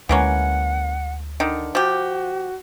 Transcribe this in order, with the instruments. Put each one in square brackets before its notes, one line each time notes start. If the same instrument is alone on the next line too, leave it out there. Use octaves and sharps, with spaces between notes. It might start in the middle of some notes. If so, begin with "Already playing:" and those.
[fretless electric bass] D2 G#3 [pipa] E3 A#3 C#4 [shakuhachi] F#5
[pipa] D3 D#3
[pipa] F3 G4 [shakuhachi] F#4